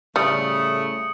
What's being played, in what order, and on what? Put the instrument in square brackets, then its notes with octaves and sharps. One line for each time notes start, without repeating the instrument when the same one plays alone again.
[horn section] A2 C#3 A3 [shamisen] G3 [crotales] D#6 C#7